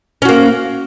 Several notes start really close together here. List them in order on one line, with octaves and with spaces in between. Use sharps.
C#4 F#4 A#3